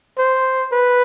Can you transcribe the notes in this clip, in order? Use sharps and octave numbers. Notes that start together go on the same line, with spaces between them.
C5
B4